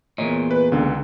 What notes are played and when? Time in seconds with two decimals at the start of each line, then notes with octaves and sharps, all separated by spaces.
0.18 E2 A#2 C#5 D#5
0.51 B4
0.72 C#2 D3